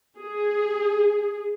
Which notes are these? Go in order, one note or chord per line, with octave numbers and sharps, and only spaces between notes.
G#4